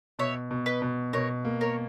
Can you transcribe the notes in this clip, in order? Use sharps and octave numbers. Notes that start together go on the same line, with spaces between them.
B2 C#5 E5
B2
B4 D#5
B2
B2 A#4 C#5
A#3
A#4 C#5